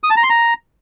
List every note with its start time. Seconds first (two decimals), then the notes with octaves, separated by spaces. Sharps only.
0.03 D#6
0.10 A5
0.17 A#5
0.23 C6
0.30 A#5